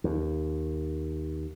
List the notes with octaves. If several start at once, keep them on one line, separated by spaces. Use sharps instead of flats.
D#2